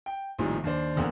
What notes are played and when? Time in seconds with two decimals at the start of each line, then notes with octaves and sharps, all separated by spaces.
0.06 G5
0.39 A#1 A2 C3 D#3 F3 G3
0.64 D#2 D4 C5
0.96 D1 E2 D3 A#3